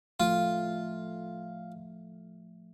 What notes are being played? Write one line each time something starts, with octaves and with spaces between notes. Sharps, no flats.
F3 A3 F4